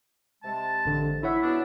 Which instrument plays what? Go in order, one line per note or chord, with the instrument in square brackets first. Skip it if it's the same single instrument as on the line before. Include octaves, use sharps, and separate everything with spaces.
[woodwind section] C3 G#3 A5
[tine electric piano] A1 D3
[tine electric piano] E4 C#5 F#5 [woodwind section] E5
[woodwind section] B2 B3 D4